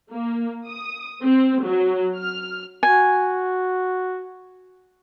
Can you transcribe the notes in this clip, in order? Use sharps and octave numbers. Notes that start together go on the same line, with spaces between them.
A#3
D#6
C4
F#3
F6
F#4 G#5